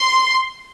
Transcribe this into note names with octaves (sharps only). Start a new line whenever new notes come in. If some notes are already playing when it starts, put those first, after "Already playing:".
Already playing: C6